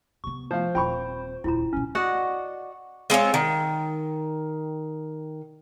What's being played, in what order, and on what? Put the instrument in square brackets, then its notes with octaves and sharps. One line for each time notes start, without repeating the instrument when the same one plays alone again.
[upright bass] C3 B3 [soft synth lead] C#6
[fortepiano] F3 F5 [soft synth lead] C5
[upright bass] D#1 C4 [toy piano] F4 B5 [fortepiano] G5 C#6
[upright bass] D#1 C#2 [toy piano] E4 F4 A#5
[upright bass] D2 B2 [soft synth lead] C#4
[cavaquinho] F#4 D5 D#5 F#5
[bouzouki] G#3 C4 F4 C#5
D#3